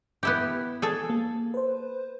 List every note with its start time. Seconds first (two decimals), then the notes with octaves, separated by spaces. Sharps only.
0.23 B3 E4 G4
0.82 G#4 A4
1.10 A#3
1.54 B4 C5